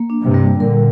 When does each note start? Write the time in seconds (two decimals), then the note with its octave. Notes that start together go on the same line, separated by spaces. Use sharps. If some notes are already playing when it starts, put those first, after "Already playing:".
Already playing: A#3
0.10 D4
0.22 G2 C3
0.34 G3
0.60 A#2 D3 A#4